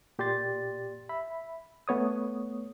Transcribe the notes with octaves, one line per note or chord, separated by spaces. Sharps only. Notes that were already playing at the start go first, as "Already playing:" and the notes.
A#2 G4 D5 C6 A6
E5 B5
A3 B3 C#5 D#6